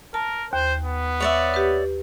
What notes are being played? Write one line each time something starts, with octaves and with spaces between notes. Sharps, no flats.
A#4 A5
D#2 C5
B3
C#5 D5 E5
G4 B4